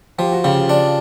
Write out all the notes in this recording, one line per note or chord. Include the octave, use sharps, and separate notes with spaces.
F3 G4
F#4
C#3 F4 G4
D4